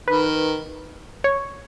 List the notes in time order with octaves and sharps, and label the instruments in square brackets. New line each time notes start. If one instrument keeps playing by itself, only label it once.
[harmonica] D#3 [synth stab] B4
[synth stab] C#5